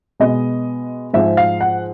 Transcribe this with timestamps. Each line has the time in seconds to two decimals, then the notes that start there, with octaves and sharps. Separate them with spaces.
0.20 B2 G#3 B3 D#5
1.14 G#2 F3 G#3 E5
1.37 F5
1.61 F#5